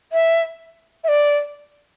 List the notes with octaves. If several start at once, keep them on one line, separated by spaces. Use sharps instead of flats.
E5
E5
D5